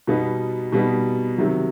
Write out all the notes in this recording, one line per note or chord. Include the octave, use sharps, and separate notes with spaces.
B2 G3 B3 D#4
B2 G3 B3 D#4
C3 D#3 F#3